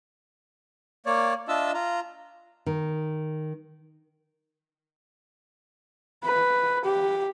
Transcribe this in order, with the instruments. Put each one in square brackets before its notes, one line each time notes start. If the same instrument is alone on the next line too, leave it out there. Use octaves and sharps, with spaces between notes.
[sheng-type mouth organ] A#3 C#5 D5
D4 F4 D#5 E5 A5 E6
F4 A#5
[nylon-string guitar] D#3
[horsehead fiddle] B4
G4